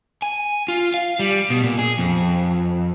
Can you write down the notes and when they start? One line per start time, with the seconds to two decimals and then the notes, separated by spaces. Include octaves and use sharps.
0.22 G#5
0.68 F4
0.94 F5
1.19 G3
1.50 B2
1.63 A#2
1.79 G#4
1.98 F2